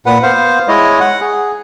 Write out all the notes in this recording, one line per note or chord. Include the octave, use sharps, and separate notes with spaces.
A#2 B4 F#5
B3 C5 F5
G#3 E4 C#5 D#5
F#5
G#4